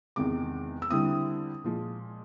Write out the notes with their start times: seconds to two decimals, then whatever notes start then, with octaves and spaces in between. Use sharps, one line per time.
0.16 E2 C3 D#3 G#3 D6
0.82 E6
0.90 D3 G3 C4 E4 D#6
1.64 A#2 F3 G#3